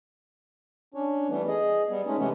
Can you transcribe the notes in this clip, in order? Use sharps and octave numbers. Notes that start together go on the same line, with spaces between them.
C#4 D4 C#5
E3 G3 A3 B3
G#4 D#5
G3 B3
G#3 A3 C#4 D#4
A2 C3 E3 A3 B3 C#4